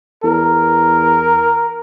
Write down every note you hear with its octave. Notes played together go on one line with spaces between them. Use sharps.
E2 A#4